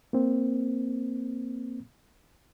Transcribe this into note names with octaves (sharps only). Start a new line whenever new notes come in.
A#3 C4